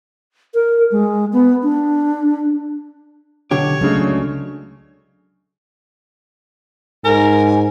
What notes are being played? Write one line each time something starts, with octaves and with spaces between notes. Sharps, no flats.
A#4
G#3
B3
D4
B1 D3 G4 C#5
C#2 C#3 F#3 G#3 A3 D4 G#4
G#2 A#4 G#5